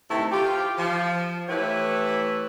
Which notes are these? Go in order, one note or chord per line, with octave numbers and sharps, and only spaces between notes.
C3 D#3 E3 A3 E4
F4 G4
F3
E3 A3 E4 G4 B4 C#5